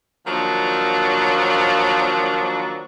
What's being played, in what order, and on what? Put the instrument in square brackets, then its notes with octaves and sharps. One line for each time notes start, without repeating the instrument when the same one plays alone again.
[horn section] D#3 F3 F#3 A#3 D4